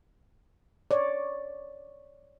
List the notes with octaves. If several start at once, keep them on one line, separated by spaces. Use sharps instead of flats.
C#5 D5